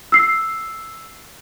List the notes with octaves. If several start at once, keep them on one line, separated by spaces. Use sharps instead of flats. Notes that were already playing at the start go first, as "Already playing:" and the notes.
E6 C7